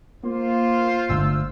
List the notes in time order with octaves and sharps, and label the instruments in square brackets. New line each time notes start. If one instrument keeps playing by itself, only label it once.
[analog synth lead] A#3 [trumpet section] F4 C5
[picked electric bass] G1 D3 A3 [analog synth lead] E6